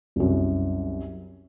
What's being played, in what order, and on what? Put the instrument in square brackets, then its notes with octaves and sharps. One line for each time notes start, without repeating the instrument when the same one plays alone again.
[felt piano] C2 F#2